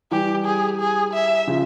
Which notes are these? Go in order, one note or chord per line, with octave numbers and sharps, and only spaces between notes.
E3 G3 G4
G#4
G#4
E5
C#3 F3